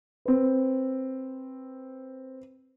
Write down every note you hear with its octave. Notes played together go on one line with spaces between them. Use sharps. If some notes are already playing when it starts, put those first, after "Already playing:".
C4 B4